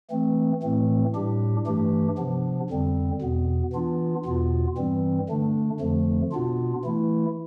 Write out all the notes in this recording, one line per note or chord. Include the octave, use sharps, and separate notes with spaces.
E3 A3 C4
A2 E3 A3 C4
A2 G3 D4 G4
G2 E3 A3 D4 G4
C3 F3 B3 D4
F2 D3 G3 C4
E2 B2 B3
E3 B3 D4 F4
E2 B2 B3 F4
G2 E3 G3 C4
D3 A3 D4
F2 D3 F3 A3
B2 B3 D4 F4
E3 A3 E4